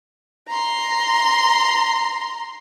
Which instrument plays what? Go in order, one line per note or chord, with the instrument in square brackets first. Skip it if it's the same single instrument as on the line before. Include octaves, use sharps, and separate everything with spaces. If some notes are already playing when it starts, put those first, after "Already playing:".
[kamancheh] A#5 C6